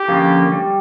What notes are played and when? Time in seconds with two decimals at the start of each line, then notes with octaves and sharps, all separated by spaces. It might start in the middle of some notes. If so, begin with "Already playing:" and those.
Already playing: G4
0.08 D3 F3 A#3 C#4
0.52 G3